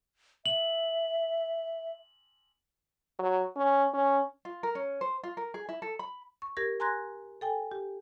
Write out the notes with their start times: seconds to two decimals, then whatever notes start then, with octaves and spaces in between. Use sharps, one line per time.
0.46 E5 F#7
3.19 F#3
3.56 C#4
3.94 C#4
4.45 F4
4.63 A#4
4.75 C#4
5.01 C5
5.23 F4
5.37 A#4
5.54 G#4
5.69 E4
5.82 A4
5.99 B5
6.42 C#6
6.57 G4 A#4 G#6 A#6
6.80 G#5 A#5 C6 F#6 G#6 A#6
7.41 A4 G5 G#5
7.72 G4